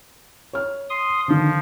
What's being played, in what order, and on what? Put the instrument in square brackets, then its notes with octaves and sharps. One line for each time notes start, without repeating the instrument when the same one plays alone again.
[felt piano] C#5 F6
[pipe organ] C6 D#6
[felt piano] D3 D#3 [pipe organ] F3